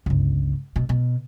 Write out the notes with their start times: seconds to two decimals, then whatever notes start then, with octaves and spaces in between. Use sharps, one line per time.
0.06 G1 C#2
0.76 B2
0.89 B2